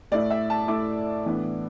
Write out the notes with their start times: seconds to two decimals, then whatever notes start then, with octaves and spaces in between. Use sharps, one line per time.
0.11 A2 A3 E4 D5
0.30 E5
0.50 A5
0.68 A2 A3 E4 D6
1.26 A2 E3 B3 D4